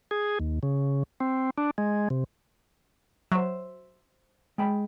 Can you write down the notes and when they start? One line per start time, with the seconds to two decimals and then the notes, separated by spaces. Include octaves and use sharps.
0.11 G#4
0.40 D#2
0.63 C#3
1.20 C4
1.58 D4
1.78 G#3
2.10 C3
3.32 F#3 C5 E5
4.58 G#3 G5 B5